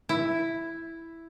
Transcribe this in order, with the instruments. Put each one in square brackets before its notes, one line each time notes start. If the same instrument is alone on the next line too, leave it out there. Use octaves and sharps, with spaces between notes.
[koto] E4